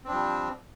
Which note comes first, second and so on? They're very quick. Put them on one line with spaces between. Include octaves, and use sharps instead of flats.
C4 D4 F3 G3